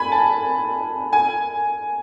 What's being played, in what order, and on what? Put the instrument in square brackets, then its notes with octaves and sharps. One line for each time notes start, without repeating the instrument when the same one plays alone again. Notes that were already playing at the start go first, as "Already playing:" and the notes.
Already playing: [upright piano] G#5 B5
A5
G#5